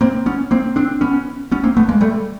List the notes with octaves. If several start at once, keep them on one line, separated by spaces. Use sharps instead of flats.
A#3 C4
B3 C#4
A#3 C4
C4 D4
B3 C#4
B3 C#4
A#3 C4
A3 B3
G#3 A#3
G3 A3